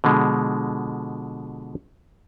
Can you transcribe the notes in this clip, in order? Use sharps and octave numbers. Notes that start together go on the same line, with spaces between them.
B2 D3 F3 G#3